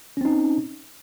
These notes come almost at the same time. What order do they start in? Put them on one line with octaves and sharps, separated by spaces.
C#4 C4 D#4